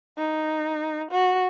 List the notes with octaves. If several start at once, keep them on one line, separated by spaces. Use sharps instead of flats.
D#4
F#4